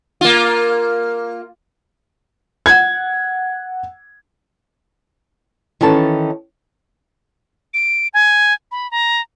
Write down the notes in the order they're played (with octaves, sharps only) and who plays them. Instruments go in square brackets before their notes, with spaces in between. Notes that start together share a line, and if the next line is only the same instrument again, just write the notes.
[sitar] A#3 F4
[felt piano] F#5 G#6
[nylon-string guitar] D#3 E3 C#4 A4 A5
[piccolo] D7
G#5
B5
A#5